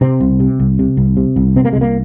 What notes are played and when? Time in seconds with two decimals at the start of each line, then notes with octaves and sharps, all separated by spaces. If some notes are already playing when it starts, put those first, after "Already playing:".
0.01 C3 C4
0.21 C2
0.40 C3
0.60 C2
0.79 C3
0.97 C2
1.17 C3
1.36 C2
1.56 C3 C4
1.65 A#3
1.73 C2 G#3
1.81 A#3